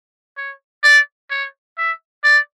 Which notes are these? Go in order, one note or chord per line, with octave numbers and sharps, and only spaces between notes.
C#5
D5
C#5
E5
D5